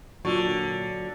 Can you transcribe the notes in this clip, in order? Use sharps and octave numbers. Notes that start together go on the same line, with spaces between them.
A#2 D3 F#3 F4 C#6